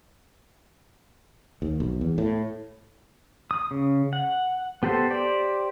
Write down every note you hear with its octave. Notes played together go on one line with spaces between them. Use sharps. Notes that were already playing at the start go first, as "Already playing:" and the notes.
D#2
B1
E2
A2
D#6
C#3
F#5
B3 G4 A4 C5
G4 C5 D5